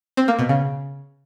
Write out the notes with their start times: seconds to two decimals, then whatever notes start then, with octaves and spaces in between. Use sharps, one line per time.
0.17 C4
0.28 A#3
0.39 B2
0.49 C#3